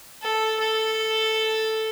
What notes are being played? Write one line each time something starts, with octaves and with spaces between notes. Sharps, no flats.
A4
A4